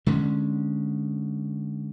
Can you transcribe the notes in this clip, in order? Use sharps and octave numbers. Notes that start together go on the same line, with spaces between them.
D3 G#3 C#4